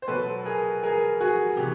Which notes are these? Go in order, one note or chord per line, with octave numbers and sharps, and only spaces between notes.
C5
B2 F#3 A4 B4
G#4 A#4
G#4 A#4
F#4 G#4
C3 E3 G4